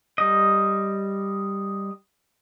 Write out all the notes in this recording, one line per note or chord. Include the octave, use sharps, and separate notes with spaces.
G3 D#5